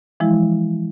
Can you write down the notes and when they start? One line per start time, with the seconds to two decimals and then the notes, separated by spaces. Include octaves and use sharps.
0.20 E3 F3 G#3 E4